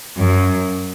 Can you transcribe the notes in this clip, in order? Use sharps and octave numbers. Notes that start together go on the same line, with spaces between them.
F#2